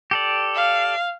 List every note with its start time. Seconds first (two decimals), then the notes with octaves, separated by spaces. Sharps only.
0.11 G4 A4 D5
0.56 F5